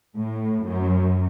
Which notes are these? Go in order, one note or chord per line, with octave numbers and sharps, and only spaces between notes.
A2
F#2